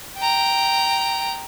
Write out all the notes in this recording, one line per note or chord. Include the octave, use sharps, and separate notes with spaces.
G5 A#5